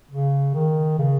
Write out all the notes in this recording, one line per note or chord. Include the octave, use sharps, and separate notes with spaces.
C#3
D#3
C#3